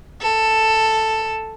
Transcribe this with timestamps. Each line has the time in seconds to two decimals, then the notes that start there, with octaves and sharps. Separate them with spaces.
0.22 A4